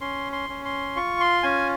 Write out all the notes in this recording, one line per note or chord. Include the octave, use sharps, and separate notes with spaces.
C#4 C6
C6
C#4
C6
F4 C#6
C6
C#4 G#5